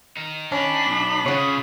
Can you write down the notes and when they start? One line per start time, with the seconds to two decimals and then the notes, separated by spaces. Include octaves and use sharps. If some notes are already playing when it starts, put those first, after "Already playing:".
0.17 D#4 A#4
0.52 C#4 D4 B5
0.86 B1
1.26 C#3 F4 G#4 C#5 F#5